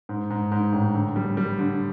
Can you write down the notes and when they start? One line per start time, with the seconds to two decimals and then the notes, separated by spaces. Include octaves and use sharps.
0.09 G#2
0.30 G#2
0.52 G#2
0.73 A1
0.94 D3
1.16 G3
1.37 G3
1.59 D3